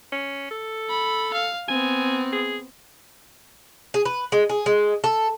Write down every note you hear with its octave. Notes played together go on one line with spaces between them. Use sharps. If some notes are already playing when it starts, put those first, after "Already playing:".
C#4
A4
B5
F5
B3 C4 G#5
G#4
G#4
B4
G#3
G#4
G#3
A4